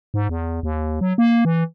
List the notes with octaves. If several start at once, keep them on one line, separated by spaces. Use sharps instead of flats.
G#2
E2
D#2
F#3
A#3
E3